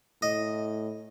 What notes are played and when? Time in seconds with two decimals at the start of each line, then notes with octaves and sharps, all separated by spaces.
0.22 A2 D#5